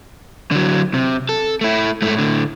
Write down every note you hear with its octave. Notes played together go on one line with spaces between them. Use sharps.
D3 F#3
C3
A4
A3 E4
G#2 A3
A2 D3